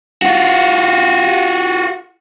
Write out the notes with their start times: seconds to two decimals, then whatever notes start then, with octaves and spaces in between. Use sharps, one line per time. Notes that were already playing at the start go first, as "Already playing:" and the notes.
0.22 F4 F#4